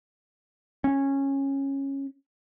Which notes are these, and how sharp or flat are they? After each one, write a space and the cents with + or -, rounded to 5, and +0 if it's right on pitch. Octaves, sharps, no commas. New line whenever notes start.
C#4 -15